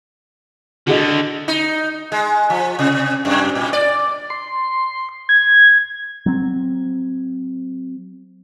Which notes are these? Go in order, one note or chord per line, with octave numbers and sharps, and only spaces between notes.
D2 D3 F#4 G#4 D#5
D#4
G#3
F3
C3
F#2
A2
D5
C6
G#6
F#3 C4